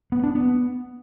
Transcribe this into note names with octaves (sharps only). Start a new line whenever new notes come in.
B3
D4
B3